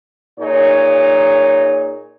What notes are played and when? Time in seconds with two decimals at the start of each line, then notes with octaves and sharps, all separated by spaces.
0.39 A#2 D#4 G#4 C#5